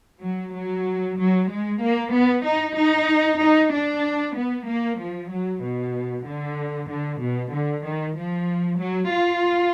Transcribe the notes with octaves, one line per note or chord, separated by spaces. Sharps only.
F#3
F#3
F#3
G#3
A#3
B3
D#4
D#4
D#4
D4
B3
A#3
F3
F#3
B2
D3
D3
B2
D3
D#3
F3
F#3
F4